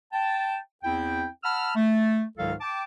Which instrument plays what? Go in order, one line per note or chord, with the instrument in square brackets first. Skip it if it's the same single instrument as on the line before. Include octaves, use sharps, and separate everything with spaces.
[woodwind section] G5 A5
E2 C4 E4 G5
F#5 A5 B5 E6 F6
A3
C#2 G#2 D#3 F#3 A4 F5
G5 A5 D6